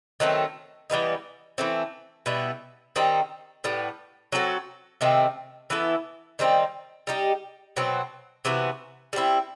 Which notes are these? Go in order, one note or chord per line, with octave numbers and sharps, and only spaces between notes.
D#3 F#3 A3 C4
E3 G3 B3 D#4
E3 A3 C4
B2 G3 B3 E4
D#3 G3 C4 D#4
A2 G3 B3
F#3 C4 F#4 A4
C3 D#3 A3 C4
E3 B3 E4 A4
D#3 G3 C4 D#4
G3 D#4 G4
B2 F#3 C4
C3 E3 B3 F#4
G3 C4 E4